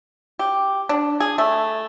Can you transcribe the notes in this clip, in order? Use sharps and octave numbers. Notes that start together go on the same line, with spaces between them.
G4
D4
G#4
A3